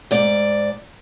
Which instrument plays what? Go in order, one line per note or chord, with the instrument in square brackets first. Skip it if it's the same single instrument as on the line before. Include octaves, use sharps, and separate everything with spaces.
[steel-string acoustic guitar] G#2 D5